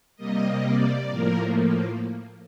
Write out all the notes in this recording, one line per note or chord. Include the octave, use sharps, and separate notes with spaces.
C3 G3 A#3 D#5
D5
A2 F3 A#3 A#4